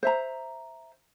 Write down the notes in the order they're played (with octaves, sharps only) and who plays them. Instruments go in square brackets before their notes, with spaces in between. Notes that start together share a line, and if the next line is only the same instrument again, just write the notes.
[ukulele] C5 E5 A#5